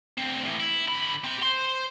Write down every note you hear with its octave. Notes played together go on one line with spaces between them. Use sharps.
D2 C4
A2 E3
E4
D3 B5
C4 G4
C5 C6